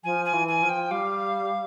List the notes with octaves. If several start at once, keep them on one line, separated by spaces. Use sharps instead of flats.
F3 G#5
G#5
E3
G#5
F3
G5
G3 F5